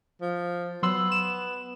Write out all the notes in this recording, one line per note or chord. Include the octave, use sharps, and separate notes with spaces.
F3
F#3 B3 C6 E6
E7